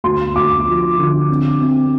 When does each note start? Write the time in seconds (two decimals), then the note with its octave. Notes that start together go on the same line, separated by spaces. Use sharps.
0.04 D2 C6
0.36 D2 D6
0.67 F3
0.98 D3
1.29 C4
1.61 C4